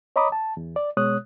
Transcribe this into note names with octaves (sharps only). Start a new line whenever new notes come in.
C#5 D#5 A#5 B5 D6 D#6
A5
E2
D5
B2 G#3 C#5 D#6 F#6